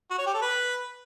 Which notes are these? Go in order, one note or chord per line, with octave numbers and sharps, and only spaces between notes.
F#4
C#5
G4
A4
B4